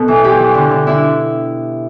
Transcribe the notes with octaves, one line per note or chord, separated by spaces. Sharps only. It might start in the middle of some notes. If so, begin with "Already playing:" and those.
Already playing: B2 A4
E3
E2 G4
E3
D3
D3
D3 E4